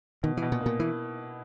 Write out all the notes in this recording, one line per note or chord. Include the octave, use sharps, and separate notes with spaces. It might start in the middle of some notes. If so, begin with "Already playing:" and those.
B2 D#3
E3
B2
A#2
A#3
A#2
E3 E4